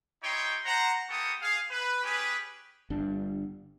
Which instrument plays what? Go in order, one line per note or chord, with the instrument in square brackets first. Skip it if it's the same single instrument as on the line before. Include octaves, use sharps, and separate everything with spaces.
[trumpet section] D#4 E4 G4 C#5 G5 C6
C5 F#5 A#5
A#3 B3 G4 A4 C#6 D#6
G#4 F5
B4
C#4 G4 G#4 B4
[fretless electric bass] G1 G2 D4